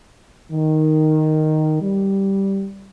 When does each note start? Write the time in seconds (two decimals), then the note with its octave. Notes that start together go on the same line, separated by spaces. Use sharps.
0.52 D#3
1.82 G3